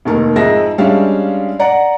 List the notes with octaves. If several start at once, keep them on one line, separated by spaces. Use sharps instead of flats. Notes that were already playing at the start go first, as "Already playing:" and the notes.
F1 D#2 D#3 A#4
F2 G#2 G#3 E5 A#6
G3 G#3 C#4 D4 E5 F5
D5 F#5 A#5